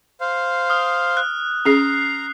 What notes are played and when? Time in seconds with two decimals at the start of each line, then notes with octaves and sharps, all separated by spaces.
0.21 C5 F5
0.70 D#6 F6
1.17 F#6
1.65 C#4 G#4 A#5 D#6 C7 F7